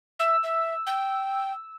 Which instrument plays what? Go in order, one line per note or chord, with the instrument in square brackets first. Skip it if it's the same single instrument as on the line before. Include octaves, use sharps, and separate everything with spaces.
[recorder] E5 [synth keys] E6
[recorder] E5
G5